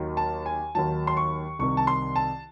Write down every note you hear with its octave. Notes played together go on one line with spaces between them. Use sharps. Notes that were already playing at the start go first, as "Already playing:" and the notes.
Already playing: D#2 D#3 F#3
A5
G#5
D#2 D#3 F#3 A5
C6
C#6
C2 C3 D#3 C#6
A5
C6
A5